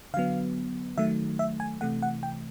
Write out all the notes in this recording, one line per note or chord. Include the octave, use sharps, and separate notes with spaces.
D3 F#3 B3 F5
D#3 F#3 A3 E5
E5
G#5
C3 E3 A3 F#5
F#5
G5